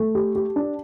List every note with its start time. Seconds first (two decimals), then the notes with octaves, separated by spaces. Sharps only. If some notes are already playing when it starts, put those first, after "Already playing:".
Already playing: A3
0.15 G4
0.35 G4
0.56 D4